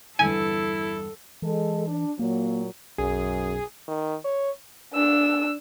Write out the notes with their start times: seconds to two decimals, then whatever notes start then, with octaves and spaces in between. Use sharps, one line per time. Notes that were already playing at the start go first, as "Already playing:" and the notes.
0.19 G1 E2 G2 E4 A4 G#5
1.42 E3 G#3 A4
1.87 D4
2.19 A#2 F#3 A#3
2.98 B1 F#2 G#4
3.88 D#3
4.25 C#5
4.93 D4 E6